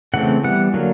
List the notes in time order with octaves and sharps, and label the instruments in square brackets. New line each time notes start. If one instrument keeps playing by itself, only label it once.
[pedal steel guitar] C#3 E3 A3 C4 F#5
E3 G3 B3 F#5
D3 F#3 A#3